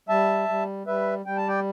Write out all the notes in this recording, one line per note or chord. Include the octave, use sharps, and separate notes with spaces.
G3 E5 A5
G3
G3 B4 E5
G3 G5
A5
D5 G5